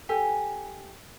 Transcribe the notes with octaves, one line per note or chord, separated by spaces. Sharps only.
G4 A4 G#5